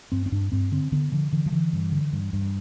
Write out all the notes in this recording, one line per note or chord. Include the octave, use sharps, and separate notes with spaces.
G2 C4
C4
G2 D4
G2 C4
D3 C4
D3 B3
D3 F3
D3 E3
F3
D3 E3
G2
D3
G2
G2